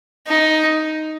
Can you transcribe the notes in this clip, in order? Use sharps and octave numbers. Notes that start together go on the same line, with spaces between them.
D#4